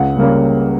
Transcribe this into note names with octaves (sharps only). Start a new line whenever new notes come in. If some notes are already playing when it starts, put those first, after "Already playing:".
Already playing: C#2 F#5
C#3 G3 A#3 C#4